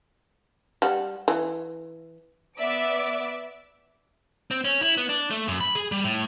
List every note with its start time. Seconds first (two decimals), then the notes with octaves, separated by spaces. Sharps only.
0.82 G3 F#5
1.28 E3
2.58 B3 D5 E5 D6 D7
4.51 C4
4.65 C#4
4.82 E4
4.98 B3
5.09 D4
5.31 A3
5.48 F#2
5.60 B5
5.75 G#4
5.92 G3
6.04 A2